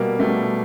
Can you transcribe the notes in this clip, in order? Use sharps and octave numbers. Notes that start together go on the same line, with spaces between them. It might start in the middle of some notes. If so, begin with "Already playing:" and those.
Already playing: B2 G3 A#3
B2 G3 A3